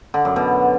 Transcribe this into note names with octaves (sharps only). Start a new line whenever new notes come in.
D3
F#2
B2